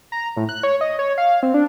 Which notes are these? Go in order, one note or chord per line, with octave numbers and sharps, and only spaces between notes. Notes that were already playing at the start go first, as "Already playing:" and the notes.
A#5
A2
F#6
C#5
D#5
C#5
F5
C4
D4